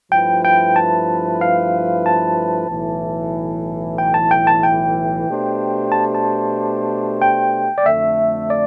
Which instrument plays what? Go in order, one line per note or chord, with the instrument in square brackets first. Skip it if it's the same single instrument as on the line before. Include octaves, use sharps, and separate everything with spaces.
[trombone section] G2 F3 A3 E4 B4 [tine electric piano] G5
[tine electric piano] G5
A5
F5
A5
[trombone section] B1 A2 E3
[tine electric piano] G5
A5
G5
A5
G5
[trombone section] B2 A3 D4 G4 C5
[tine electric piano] A5
A5
G5
D5
[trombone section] F2 D3 A3 [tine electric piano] E5
[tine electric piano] D5